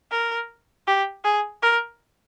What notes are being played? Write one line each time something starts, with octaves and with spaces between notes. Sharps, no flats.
A#4
G4
G#4
A#4